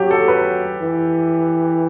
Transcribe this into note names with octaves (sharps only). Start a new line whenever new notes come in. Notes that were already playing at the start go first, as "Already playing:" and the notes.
Already playing: F#3 G4
A4
B4
E3